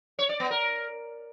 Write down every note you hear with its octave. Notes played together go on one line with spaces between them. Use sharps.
C#5
D5
B3
A#4